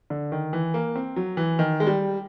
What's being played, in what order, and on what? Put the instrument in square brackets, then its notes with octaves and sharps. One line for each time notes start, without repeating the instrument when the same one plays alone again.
[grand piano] D3
D#3
E3
A#3
C4
F#3
E3
D#3
G#3
G3